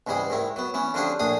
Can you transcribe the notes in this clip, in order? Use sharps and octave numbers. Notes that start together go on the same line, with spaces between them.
C#2 G#2 E3 G3 G#4
G#2 D#3 E4
F#3 B3
E3 B3 C#4
D3 F3 C#4 D4 G4 G#4
A#1 A2 D4 G#4 D#6